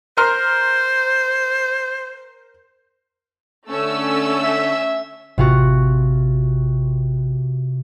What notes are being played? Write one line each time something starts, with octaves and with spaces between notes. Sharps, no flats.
A#4 C5 C6 F6
D3 A3 C#4 E6
E5
A1 C3 F4 F#4